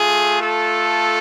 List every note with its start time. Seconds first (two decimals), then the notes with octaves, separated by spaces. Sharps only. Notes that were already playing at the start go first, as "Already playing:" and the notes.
Already playing: A3 F4 G#4
0.42 A4